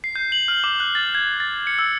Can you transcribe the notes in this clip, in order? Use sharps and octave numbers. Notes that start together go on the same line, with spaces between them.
C7
G6
F#7
F6
D6
F#6
A6
G#6
A6
C#7
E6